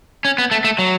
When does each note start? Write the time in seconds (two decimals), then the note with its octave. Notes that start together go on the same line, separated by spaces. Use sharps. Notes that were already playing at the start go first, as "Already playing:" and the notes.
0.25 C#4
0.38 B3
0.51 A3
0.64 A3
0.79 F#3